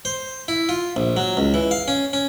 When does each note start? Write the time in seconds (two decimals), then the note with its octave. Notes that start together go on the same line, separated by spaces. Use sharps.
0.05 C5
0.48 E4
0.69 F4
0.96 A#1
1.17 F#3
1.37 C#2
1.54 E3
1.71 F5
1.88 C#4
2.13 C#4